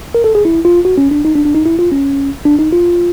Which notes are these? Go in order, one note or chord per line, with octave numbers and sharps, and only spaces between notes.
A#4
A4
G#4
E4
F4
F#4
C#4
D4
D#4
D4
D4
D#4
E4
F4
C#4
D4
D#4
F4